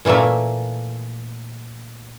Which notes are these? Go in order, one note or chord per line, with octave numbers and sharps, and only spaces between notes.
A#2 E3 A3 A#3 E5